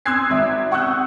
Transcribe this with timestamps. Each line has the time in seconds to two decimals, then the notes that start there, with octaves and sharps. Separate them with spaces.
0.06 C6 D#6 E6 F#6 G#6 C7
0.30 G#1 E5
0.71 F#5 C#6 D#6 E6 F#6 G6